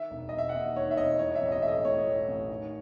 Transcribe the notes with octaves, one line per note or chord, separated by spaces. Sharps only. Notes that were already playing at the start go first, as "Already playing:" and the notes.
Already playing: D#3 E5
E1
E1 D#5
E5
F#5
D#2 E5
D#3 C#5
E5
E1 D#5
E3 C#5
E5
A1
D#5
A3 E5
D#5
A2 C#5
E3
A1
D#3